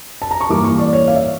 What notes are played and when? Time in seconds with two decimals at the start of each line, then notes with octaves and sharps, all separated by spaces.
0.22 A5
0.31 A#5
0.41 C#6
0.49 G2 E3 A#3 D6
0.65 C#6
0.79 D5
0.93 C#5
1.08 F5
1.15 E5